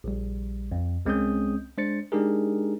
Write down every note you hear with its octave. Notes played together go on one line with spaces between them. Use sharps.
A#1 G3
F2
C2 G#3 C4 C#4 D#6 G6
G#3 D4 C5 A6 C#7
G#3 D4 D#4 G4 G#4 A#4